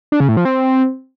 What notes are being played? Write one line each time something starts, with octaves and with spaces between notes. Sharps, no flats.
D4
C#3
A2
F3
C4